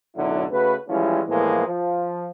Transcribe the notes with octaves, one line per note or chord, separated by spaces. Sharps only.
B1 F#2 A2 D3 F#3 E4
C#3 A3 F#4 B4
E3 F3 G3 G#3 C#4 E4
A2 E3 F3 G#3 A#3 B3
F3